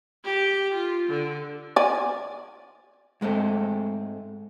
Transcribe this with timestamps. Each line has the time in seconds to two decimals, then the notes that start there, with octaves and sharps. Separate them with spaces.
0.24 G4
0.74 F4
1.09 D3
1.76 D5 G#5
3.21 G#2 G#3 A3 C4